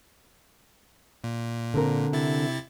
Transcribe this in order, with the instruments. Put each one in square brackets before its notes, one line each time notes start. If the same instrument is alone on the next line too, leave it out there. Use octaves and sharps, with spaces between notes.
[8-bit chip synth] A#2
[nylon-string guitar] D3 C4 A#4
[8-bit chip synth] C3 E4 A6